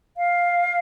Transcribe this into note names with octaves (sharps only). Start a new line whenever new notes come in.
F5